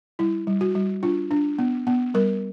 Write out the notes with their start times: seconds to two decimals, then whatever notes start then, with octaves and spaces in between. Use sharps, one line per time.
0.19 G3 E4
0.47 G3
0.61 F#4
0.75 G3
1.03 D4 F4
1.31 D4
1.59 B3
1.87 B3
2.14 G3 A#4